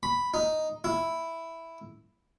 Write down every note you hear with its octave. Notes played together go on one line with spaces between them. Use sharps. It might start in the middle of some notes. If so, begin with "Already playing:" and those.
B5
D#4
E4